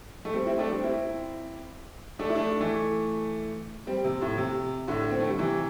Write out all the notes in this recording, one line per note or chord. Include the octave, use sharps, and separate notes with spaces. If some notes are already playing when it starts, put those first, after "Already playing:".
A3
G3 C4
C4 E4
A3 D4
G3 C4
C4 E4
A3 D4
E4
A3 D4
E3 A3
G3 C4
C3
A2
C3
A2 D3
C4
A3
G3
C3 E3